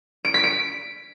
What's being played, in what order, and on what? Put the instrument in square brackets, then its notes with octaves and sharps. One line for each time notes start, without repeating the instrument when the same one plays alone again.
[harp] D7
B6
D7